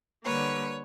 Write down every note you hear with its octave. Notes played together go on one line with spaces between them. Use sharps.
D3 G3 A#3 B4 C#5